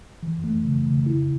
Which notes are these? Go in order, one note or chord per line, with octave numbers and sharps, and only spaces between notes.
E3
A3
C#3
C#3
E4